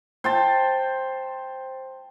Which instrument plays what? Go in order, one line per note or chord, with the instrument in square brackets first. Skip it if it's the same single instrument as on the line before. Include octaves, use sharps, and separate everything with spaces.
[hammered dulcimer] C5 G5 A5